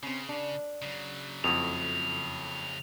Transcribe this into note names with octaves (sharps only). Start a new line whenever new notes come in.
C#3 C4 C#4
D4
C#3 F#3
F2 A3 E4 F#4 D#6 F7